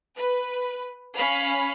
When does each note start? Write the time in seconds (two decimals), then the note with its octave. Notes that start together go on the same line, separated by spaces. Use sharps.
0.17 B4
1.17 C#4 F5 B5